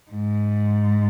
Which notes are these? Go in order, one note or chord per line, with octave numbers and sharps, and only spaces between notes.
G#2